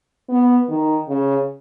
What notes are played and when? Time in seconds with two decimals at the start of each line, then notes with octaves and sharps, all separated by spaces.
0.29 B3
0.69 D#3
1.08 C#3